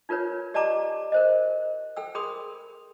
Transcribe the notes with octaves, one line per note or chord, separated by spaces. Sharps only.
D#4 F4 A#4 B4 C#5
G4 D5 D#5 A5 A#5 D6
A#4 C5 D#5
A4 G5 E6
G#4 A#4 B5 C6 D#6